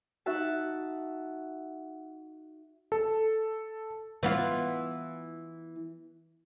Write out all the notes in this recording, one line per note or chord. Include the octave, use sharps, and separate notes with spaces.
D#4 F#4 E5 F#5 A5
A4
E3 B3 F4